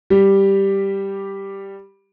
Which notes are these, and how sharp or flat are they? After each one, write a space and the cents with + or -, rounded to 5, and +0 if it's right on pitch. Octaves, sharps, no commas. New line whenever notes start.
G3 +0 G4 +0